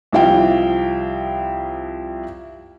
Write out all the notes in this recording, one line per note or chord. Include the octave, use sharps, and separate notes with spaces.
C2 F3 E4 F5 G5